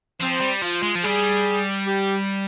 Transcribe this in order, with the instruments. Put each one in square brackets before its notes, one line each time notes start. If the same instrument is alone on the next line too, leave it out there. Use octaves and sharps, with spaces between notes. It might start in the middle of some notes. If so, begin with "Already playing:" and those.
[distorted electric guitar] F3 [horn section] C4
[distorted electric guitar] G3
[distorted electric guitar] F3 [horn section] F4
[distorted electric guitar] G#3
F3
[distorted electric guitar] G3 [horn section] G#4
[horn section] G4